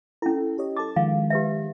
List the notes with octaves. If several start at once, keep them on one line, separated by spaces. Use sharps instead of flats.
C#4 E4 A4
G4 C#5 D#5
A4 A5 D6 A6
D#3 F3 G#3 F5
G4 B4 E5